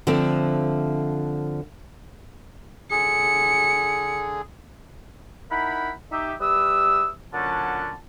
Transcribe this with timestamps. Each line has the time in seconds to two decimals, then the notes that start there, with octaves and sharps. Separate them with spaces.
0.07 D3 F3 A3 C4
2.91 D3 G#4 C#7
5.51 D#4 E4 A#4 F#5 G5 B5
6.11 D#4 G4 E5
6.41 G3 B4 E5 D#6 E6
7.33 A#2 D3 F#3 C#4 F#5 A5